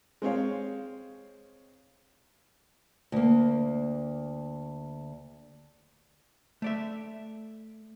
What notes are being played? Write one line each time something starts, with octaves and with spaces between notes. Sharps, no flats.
G#3 C4 C#5 F5
D2 A#3
A3 D5 E5